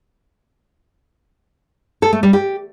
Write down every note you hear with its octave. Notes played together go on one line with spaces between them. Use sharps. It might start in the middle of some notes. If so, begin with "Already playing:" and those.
A4
A3
G3
G4